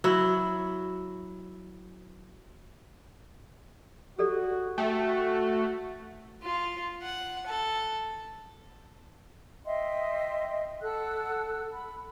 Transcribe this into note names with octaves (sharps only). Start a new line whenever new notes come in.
F#3 E4
F#4 G4 A4 D5
A3 F#4 G5
F4
F#5
A4
D#5 E5 G5 C6
A4 F#5 E6 F#6
B5